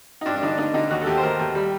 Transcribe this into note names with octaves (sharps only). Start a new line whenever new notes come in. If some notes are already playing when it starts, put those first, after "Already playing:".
D#4
G2 D4
D4
D3 D#4
D4
D3 D#4
D3 D#4
D#2 F#4
A4
D#2 G4
C5
D#2 A#4
D#2
G3